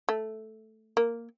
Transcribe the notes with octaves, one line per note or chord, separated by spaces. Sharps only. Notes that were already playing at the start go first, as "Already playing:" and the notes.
A3
A#3